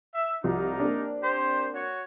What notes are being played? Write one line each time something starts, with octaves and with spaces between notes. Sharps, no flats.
E5
C2 F3 D#4 F#4 A#4 D5
A#3 C4 D4
G4 C5
F#4 C#5